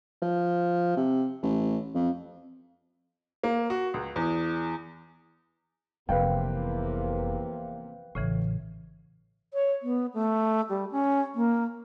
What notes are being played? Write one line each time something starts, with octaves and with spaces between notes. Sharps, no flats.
F3
C3
A1
F2
A#3
F#4
C#2
E2
F1 E2 C3 F3 A#3 B4 F5 G5
A1 A2 C#3 E3
C#5
B3
A3
G3
C#4
A#3